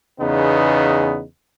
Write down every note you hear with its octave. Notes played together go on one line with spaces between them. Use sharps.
E2 C#3 B3 D#4